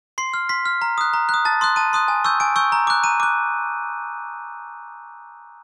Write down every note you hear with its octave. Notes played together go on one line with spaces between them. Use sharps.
C6 C7
F6
C6 B6
F6
A#5
D#6 F#6
A#5
D#6 F#6
A5 A6
C6 D#6 F#6
A5 D#7
C6 D#6 F#6
G#5
C#6 E6 G6
G#5 D7
C#6 E6 G6
A#5
D6 F#6
A#5 D#7
D6 F#6